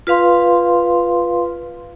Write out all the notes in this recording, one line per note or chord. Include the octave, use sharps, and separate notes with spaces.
F4 B4 F5 C6